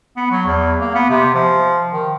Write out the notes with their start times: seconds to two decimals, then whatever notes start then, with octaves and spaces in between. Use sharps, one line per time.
0.17 B3
0.31 F#3
0.46 E2
0.80 A#3
0.95 B3
1.10 C3
1.34 F3
1.93 D#3